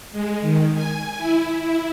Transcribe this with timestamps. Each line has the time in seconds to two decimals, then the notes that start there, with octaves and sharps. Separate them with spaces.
0.12 G#3
0.42 D#3
0.74 G#5
1.18 E4
1.61 E4